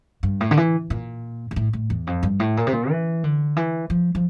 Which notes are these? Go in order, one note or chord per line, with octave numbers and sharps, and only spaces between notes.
G2
A2
D3
E3
A#2
A#2
A2
A2
E2
F2
G2
A2
A#2
C3
A#2
E3
D3
E3
F3
F3